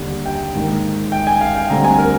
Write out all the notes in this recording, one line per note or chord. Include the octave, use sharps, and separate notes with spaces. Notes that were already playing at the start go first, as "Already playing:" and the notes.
Already playing: D#2 D3 G3
G5
G#2 D#3 A#3
G5
G#5
F5
G5
D2 D3 G3 C4 A#5
G#5
A#4